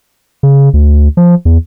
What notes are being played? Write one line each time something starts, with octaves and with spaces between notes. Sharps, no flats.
C#3
D2
F3
E2